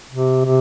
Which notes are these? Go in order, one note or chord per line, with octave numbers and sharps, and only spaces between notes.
C3
C3